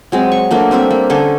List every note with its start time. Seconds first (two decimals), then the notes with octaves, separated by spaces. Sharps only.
0.12 F#3 G#3 C4
0.32 C#6
0.51 A3 A#3 D4 F#4
0.71 G3 C4 G4 E5
0.90 A#3
1.10 D3 C#4 D4 A4